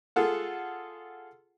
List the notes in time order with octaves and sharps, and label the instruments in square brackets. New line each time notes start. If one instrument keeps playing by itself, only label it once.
[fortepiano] F4 G#4 A4 F#5